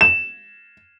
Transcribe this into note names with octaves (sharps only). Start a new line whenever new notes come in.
E7